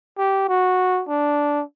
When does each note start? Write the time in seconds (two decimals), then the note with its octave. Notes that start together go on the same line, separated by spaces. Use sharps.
0.18 G4
0.49 F#4
1.09 D4